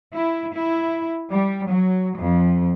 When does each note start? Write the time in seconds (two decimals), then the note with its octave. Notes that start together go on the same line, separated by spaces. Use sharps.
0.12 E4
0.54 E4
1.31 G3
1.67 F#3
2.17 F2